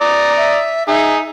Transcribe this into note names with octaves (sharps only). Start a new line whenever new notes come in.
D5 A#5 D#6
E5
D#4 G#4 E5